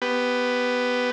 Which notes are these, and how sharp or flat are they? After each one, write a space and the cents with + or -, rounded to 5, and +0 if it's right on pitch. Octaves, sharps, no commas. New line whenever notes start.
B3 +5 G4 +0